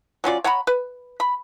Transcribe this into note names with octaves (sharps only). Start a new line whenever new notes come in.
F#3 C#4 F4 D5
C#5 F#5 A#5 B5
B4
B5